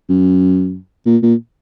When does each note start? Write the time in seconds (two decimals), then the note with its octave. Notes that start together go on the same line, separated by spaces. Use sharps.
0.09 F#2
1.06 A#2
1.23 A#2